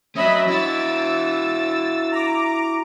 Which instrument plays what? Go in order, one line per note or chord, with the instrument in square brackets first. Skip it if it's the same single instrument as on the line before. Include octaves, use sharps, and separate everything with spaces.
[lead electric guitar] F#3 C#4 [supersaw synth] D#5 E5 B5
[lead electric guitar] E4 F#4 [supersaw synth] E6 A6
[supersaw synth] A#5 D6